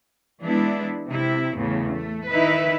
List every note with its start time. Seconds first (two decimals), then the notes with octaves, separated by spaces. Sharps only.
0.42 E3 G#3 B3 D4 E4
1.07 C3 E4
1.56 E2 A2 C#3
1.94 A3
2.29 D#3 D#4 E4 B4 E5